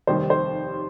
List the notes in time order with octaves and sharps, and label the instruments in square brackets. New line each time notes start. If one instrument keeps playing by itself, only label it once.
[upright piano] F1 D#2 D#3 G3 C5
C5